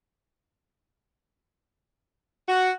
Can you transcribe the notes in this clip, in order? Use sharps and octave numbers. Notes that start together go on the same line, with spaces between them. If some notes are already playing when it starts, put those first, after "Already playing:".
F#4